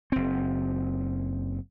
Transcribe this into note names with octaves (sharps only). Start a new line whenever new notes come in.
F#1 C4